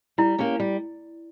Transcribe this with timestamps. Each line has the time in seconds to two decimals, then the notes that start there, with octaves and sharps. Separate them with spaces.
0.18 G3 E4
0.38 A#3 C#4 G4
0.60 G3